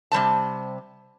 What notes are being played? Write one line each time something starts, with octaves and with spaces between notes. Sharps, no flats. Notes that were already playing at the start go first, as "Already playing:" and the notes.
C3 G3 C5 A5